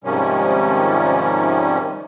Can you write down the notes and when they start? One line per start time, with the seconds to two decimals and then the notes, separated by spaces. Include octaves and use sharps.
0.04 G#2 C3 D#3 F3 G3 C#4